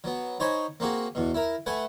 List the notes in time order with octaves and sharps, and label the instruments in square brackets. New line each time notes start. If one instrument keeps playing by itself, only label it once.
[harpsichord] F#3 B3
D#4 C5 C#5 G#5 B5
A#3 C4 F#4 G#4
E2 B2
E4 A#4
A3 B4 F#5 G#5